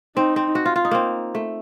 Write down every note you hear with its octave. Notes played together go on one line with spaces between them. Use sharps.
C4 D#4
C4
F#4
F4
F4
D#4
A#3 C4
A3